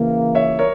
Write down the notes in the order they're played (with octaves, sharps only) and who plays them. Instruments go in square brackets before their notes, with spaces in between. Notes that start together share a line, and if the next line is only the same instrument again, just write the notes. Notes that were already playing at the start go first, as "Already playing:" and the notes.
Already playing: [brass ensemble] C#3 E3 A#3
[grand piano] C#5 E5
A#4 C#5